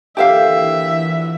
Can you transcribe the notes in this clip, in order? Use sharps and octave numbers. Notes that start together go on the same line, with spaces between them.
A#2 D3 E3 G4 C5 E5 F5